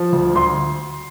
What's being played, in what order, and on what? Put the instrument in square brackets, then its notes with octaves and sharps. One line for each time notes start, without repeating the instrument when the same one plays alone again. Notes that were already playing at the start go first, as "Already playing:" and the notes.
Already playing: [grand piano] F3
D2
D2 C6